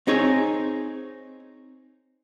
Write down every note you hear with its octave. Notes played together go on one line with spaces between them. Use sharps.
C4 D#4 G#4 C#5